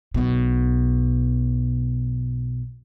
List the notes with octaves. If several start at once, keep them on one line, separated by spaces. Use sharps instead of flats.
B1 B2